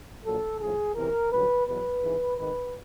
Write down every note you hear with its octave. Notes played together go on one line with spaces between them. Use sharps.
A#1 A#2 F#3 A4
A#1 A2 F3 G#4
E2 C3 E3 A#4
A1 G2 D3 F#3 B4
E2 B2 F#3 B4
G#1 G#2 E3
G#1 G#2 D#3 B4